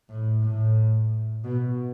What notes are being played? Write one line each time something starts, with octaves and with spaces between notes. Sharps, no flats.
A2
A2
B2